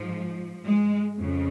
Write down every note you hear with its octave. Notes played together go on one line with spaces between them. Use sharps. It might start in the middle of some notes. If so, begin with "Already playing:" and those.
Already playing: G#2 F3
G#3
F2 C#3